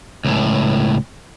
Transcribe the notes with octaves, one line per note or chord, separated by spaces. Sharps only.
C#2 A2